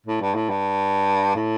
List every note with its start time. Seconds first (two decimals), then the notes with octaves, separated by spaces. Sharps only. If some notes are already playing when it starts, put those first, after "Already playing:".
0.07 A2
0.21 G2
0.35 A2
0.50 G2
1.36 A2